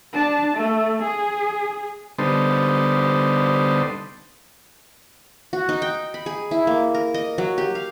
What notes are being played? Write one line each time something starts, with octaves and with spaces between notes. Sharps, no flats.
D4 A5
A3
G#4
D3 G3 B3 D#4 A4 C5
F#4
D#4
G5
B5
G#4
E4
A#3
A#4
D#5
F#3
G4
F5